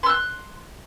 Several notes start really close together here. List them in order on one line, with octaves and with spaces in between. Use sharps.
C6 E6 F#6